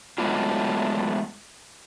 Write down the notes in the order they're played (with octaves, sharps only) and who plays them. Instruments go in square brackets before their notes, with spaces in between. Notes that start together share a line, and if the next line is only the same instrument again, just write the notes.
[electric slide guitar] F#3 G#3 A3 B3 D4 F4